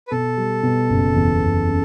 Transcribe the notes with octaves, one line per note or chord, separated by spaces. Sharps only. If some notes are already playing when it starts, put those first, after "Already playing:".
B4
B2 A4
G3
B2
F#1
E2
F#1
C#3